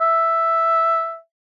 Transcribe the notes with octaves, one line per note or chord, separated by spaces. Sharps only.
E5